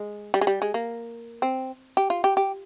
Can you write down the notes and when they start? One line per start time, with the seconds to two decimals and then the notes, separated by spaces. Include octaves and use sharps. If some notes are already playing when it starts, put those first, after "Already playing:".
Already playing: G#3
0.34 G3
0.41 G#3
0.47 G3
0.62 G#3
0.74 A#3
1.42 C4
1.97 G4
2.10 F4
2.24 G4
2.37 G4